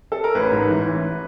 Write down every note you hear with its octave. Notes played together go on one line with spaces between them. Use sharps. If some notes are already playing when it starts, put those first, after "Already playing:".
A4
A#4
A1 B4
G#2
E3
A1